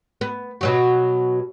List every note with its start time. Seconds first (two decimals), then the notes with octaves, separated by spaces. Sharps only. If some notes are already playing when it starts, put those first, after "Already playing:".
0.21 B3
0.61 B2 F#3 F#4